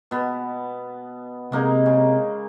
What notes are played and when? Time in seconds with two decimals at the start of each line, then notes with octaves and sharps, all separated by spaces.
0.11 B2 B3
1.52 C3 G#3 A#3 D#4
1.86 C#3